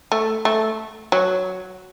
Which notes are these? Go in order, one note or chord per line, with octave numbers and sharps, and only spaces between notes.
A3
A3
F#3